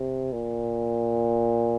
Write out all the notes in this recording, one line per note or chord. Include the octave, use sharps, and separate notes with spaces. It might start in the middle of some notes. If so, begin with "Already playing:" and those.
Already playing: C3
A#2